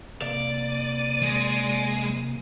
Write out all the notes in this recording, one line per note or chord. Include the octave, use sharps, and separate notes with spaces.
C3 A#3 D5
D#7
G#3